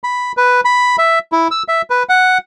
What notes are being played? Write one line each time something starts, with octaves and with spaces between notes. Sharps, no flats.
B5
B4
B5
E5
E4
E6
E5
B4
F#5